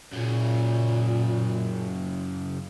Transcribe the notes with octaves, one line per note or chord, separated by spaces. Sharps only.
F#2 A#2 C#3